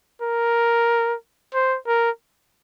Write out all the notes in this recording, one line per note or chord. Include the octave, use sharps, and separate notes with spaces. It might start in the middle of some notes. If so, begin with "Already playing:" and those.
A#4
C5
A#4